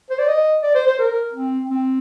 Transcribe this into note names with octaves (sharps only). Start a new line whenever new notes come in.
C5
D5
D#5
D5
C5
C5
A#4
C4
C4